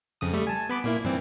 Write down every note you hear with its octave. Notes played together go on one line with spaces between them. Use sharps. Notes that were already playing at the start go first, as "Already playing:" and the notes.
F2 C#3 D#6
G3 A3
G#5 A5
B3 B5 D6
A#2 A#3 E4
G2 E3 C4